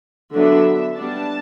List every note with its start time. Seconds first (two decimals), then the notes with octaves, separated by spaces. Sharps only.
0.33 D3 F#3 B3 D4 E5
0.96 G3 B3 D4 A5